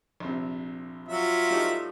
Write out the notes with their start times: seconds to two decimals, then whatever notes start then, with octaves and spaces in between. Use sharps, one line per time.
0.20 A#1 C3
1.09 F#3 F4 E5
1.50 A2 G3 D#4